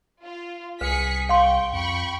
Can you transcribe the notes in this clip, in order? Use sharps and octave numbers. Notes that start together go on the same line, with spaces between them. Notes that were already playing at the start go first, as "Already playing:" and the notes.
F4
C2 G#4 B4 B6 C#7
F5 G5 C6 C#6
F2 G5 B5 C#6